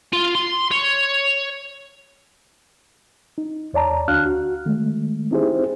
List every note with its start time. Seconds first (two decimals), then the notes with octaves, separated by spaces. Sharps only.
0.13 F4
0.35 C6
0.71 C#5
3.38 D#4
3.73 E2 C#5 D5 A5 A#5
4.08 D2 D4 F#4 F5 F6 F#6
4.26 F#4
4.66 D#3 G#3 A3
5.31 C4 D#4 E4 G4 G#4 C5